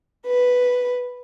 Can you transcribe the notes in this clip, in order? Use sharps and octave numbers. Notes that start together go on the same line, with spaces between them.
B4